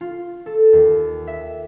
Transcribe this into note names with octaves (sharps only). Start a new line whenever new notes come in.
F4
A4
D#2
E5